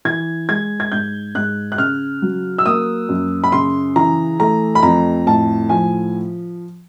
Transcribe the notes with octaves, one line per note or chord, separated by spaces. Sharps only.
E3 G#6
G#3 G#6
G#6
G#2 G6
G#2 F#6
F#6
C#3 F6
F#3
E6
A#3 D#6
F#2
B5
C#3 C6
E3 A#5
A3 A#5
B5
F2 A#5
A2 A5
F3 G#5